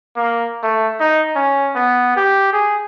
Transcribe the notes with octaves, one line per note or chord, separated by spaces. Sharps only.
A#3
A3
D#4
C#4
B3
G4
G#4